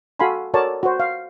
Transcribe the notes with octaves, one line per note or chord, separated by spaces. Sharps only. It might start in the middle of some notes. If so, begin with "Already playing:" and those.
F#4 A4 F5 G#5 B5 C6
F#4 A4 A#4 C#5 D5 A5
F#4 C5
F5